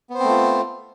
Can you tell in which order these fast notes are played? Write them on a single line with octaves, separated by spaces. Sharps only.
B3 C5 C4 A3 F4